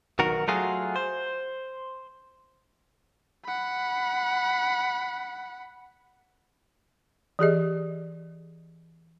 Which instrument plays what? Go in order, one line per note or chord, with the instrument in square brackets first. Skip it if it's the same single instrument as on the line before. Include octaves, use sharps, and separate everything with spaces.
[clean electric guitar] B1 D#3 F#4 A#4
F#3 A3 F4 F#4 G#4
C5
[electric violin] F#5 B5
[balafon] E3 G4 G#4 D#5